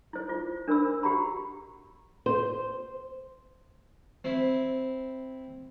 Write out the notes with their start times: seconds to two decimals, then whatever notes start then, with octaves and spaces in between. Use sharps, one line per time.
0.13 E4 C5
0.29 F4
0.68 D4 A#4 C5 B5 E6
1.03 F#4 G4 F#5 A#5 B5
2.26 C5
4.24 C4 E4